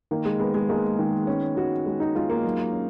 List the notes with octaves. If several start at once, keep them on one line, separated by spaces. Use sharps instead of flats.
D#3 A#3
G#3
G#3 B3
G#3
G#3 A#3
D#3
B3 C#4
D#3 F#4
G#3
D#4
G#3 F4
A#3
F#3
C#4